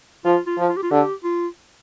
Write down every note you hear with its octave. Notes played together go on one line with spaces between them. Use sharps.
F3 F4
F4
F3
F4
G4
F4
D3 G4
F4